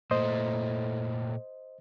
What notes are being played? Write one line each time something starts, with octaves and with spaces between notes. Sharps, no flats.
A#2 A3 C5 D#5